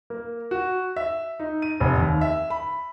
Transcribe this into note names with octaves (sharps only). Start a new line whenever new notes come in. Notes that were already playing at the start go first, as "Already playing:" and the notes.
A#3
F#4
E5
D#4
D#7
F1
D#2
E5
B5